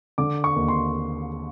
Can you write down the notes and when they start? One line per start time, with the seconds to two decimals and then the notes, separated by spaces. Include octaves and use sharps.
0.18 D3 D6
0.44 C#6
0.56 D#2
0.68 C6